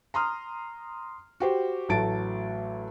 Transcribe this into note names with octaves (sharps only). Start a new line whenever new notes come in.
A#5 C6 D#6 F6
F#4 G4 C5
A1 F#3 A3 A5 A6 D7